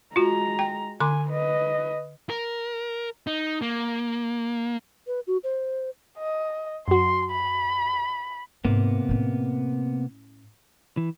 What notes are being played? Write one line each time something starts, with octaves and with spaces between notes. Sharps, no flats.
G#3 F4 F#4 A#5
G5
D3 G#5 C6 D6
B4 D#5
A#4
D#4
A#3
B4
F#4
C5
D#5
F#2 F#4 C6
B5
G#2 C3 A#3 B3
A2 C#4
E3